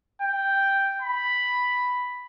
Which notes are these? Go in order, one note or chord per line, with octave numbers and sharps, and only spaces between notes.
G5
B5